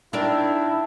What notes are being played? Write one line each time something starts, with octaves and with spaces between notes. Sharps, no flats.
D#3 D4 E4 A#4 D5 E5 A5